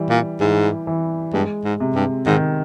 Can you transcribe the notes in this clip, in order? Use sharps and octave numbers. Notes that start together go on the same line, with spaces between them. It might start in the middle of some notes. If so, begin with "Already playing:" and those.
Already playing: E3 G3
A#2
G#2 E3
E3
G2 G#3
G#2
C3
G2
G#2 D#3